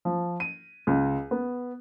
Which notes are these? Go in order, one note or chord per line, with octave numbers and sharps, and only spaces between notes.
F3
D#7
C#2
B3